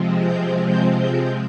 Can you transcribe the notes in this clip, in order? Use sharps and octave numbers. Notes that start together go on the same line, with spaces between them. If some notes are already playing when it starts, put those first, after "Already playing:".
Already playing: C3 F3 G#3 C4
G6
G6
G6